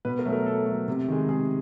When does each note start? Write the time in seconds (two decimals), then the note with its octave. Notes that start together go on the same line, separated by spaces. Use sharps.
0.05 B2 B4
0.19 A#4
0.25 F#3 A3
0.33 A#4
0.46 B2 A4
0.66 A3
0.71 F#3
0.88 C3
1.08 D#3 G#3
1.29 C3 G#4